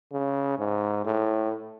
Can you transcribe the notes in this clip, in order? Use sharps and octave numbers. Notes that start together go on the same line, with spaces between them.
C#3
G#2
A2